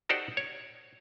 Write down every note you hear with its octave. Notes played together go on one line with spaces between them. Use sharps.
D#4 F#4 G4 A4 C5 D5
C#5